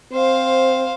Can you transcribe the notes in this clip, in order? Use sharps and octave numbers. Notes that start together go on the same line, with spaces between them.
C4 C5 F5